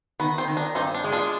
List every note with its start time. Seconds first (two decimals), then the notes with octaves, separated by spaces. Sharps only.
0.19 D#3 B3
0.38 C4
0.48 D#3
0.57 D4
0.75 G2 C4 D#4
0.94 D4
1.04 G#3
1.13 D4 F4